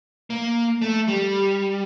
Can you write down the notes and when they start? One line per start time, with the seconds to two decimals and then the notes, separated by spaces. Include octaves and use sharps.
0.30 A#3
0.82 A3
1.08 G3